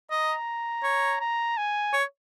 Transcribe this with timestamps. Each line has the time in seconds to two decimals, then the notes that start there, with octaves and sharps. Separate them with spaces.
0.11 D#5 A#5
0.84 C#5
1.20 A#5
1.57 G#5
1.93 C#5